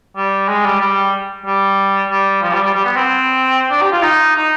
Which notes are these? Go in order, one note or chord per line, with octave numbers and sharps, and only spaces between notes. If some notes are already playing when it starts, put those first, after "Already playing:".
G3
G#3
G3
G3
G3
G3
F3
G3
G3
G3
B3
C4
D4
G4
F4
D#4
D#4